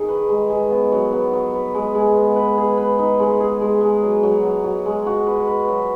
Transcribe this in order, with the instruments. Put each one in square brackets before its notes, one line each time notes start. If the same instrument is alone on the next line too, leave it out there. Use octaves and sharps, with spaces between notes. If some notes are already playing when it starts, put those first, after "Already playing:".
Already playing: [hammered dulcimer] D#3 G#4
B4
G#3
G#3
B3
F#3
B3
F#3
B4
G#3
G#3
B3
B4
G#4
B4
D#4
G#3
G#4
G#3
G#3
F#3
F#3
F#3
F#3
G#3
F#4
B4
B4
F#3